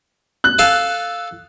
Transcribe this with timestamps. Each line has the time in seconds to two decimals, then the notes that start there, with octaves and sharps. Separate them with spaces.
0.44 F#6
0.59 A4 F5 G#5